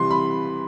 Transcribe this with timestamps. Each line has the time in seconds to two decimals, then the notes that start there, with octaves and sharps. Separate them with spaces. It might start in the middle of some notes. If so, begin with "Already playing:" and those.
Already playing: C3 E3 G3 C6
0.11 B5